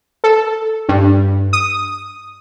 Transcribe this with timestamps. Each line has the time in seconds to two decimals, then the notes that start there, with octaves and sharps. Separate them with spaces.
0.24 A4
0.89 G2
1.53 D#6